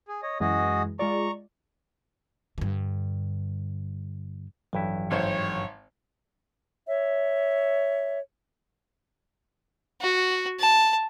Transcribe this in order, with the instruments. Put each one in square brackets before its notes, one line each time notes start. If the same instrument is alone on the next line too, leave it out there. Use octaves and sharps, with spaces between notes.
[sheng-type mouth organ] G#4
C#5 D#5
[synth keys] F#2 E3 G#3 [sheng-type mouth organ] F#4 G#4 D#5
[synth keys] G#3 F4 D5 [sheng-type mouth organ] A#5 C#6
[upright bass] G2 D3
[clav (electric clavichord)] A1 G2 E4 [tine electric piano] E3 F#3
[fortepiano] G#1 C5 [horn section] C#5
[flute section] C#5 E5
[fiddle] F#4
A5